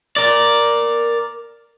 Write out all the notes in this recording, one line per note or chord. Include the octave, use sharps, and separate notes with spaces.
A#4 D5